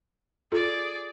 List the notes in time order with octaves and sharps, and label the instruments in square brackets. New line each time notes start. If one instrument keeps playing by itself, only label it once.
[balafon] F4 A4 [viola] G#4 D5